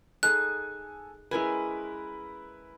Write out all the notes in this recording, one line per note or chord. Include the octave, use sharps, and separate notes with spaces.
D#4 G#4 A4 G#5 F#6
G#3 C#4 E4 A#4 B4 G#5